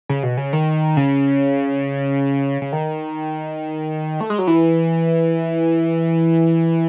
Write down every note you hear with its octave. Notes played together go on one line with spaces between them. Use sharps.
C#3
B2
C#3
D#3
C#3
C#3
D#3
A3
G#3
F#3
E3